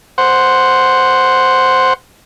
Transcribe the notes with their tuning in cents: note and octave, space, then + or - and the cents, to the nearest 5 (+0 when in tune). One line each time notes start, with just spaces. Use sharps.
C5 +0 F#5 +0